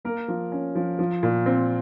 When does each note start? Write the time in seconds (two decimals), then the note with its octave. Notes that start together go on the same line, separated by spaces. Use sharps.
0.05 A#3 A#4
0.28 F3
0.52 C#4
0.75 F3
0.99 F3
1.23 A#2
1.46 C4